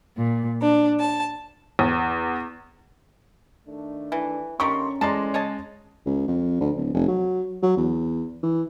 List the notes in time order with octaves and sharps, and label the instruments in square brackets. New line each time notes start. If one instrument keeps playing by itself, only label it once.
[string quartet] A#2
D4
A5
[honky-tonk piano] E2
[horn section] D#3 A3 D4
[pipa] E3
[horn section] D3 A#5 C6 [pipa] D#3 G3 A#3 [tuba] C#4 [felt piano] C#6
[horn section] E3 A3 D5 [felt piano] G#3 A#5 C6 [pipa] A5
[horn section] C#3 [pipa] C#5 D#5 A5
[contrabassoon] C#2
F2
D2
D1
F1
F#3
F#3
E2
E3